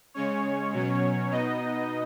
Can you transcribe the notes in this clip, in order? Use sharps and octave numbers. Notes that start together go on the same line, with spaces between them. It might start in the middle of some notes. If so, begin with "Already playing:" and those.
C#3 G#3 C#4 C#5
B2 F#3 C#4
B2 B3 D#4 D#5